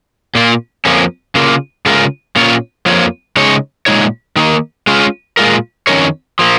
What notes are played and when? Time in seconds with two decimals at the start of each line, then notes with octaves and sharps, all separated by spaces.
0.35 A#2 A#3 F4
0.85 F2 F3 A#3 C#4
1.35 C#3 A#3 F4
1.86 C#3 G#3 F4 A#4
2.36 A#2 A#3 C#4 F4 C#5
2.86 F2 F3 A#3 F4 C#5
3.36 C#3 G#3 D#4 C#5
3.86 A#2 G#3 D#4 C#5
4.36 D#3 A#3 D#4
4.87 G#3 C#4 F4
5.37 A#2 G#3 F4 A#4
5.87 F2 D#3 C#4 A#4 C#5
6.39 F3 A#3